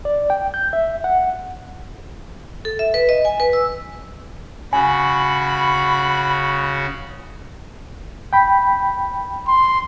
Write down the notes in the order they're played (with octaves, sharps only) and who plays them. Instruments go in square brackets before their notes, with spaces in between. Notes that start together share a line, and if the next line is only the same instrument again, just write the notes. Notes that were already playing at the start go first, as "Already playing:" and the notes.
[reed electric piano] D5
G5
G6
E5
F#5
[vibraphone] A4
E5
B4
D#5
G#5
B4
E6
[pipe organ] C#3 F#4 [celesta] G#5 [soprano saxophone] B5
[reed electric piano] G5 B5
[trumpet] C6